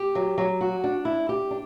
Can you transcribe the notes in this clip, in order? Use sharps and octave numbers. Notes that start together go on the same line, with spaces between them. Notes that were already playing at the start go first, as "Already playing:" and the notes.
Already playing: G4
F#3
F#3
F#4
D4
E4
G4
D4